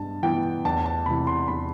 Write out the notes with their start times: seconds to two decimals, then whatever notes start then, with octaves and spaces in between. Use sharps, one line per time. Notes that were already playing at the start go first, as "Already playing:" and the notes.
Already playing: G2 B3 A5
0.23 E3 B3 G5
0.65 E2 A5
0.86 A5
1.06 C3 E3 B5
1.27 C6
1.48 E2 B5